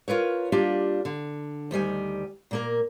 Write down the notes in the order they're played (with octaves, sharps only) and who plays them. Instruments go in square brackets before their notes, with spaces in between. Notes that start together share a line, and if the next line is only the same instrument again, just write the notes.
[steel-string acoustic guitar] F4 A#4 B4 C#5
G3 A#3 D4 F4 G4
D3
D2 D#3 G3 G#5
A#2 A#3 A#4